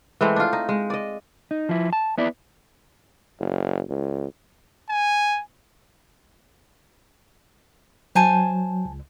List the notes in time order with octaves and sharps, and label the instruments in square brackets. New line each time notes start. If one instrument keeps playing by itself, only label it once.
[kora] E3 G#3 A3 C4
D4 F4
D#4
G#3
D5 D#5
[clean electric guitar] D#4
F3 E4
A5
B3 E4 D5
[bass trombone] F#1
C#2
[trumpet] G#5
[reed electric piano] F#3 [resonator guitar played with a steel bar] C5 G#5 A5
[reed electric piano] C#2